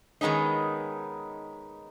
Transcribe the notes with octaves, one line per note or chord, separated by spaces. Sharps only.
D#3 G#3 B3 C#4 D#4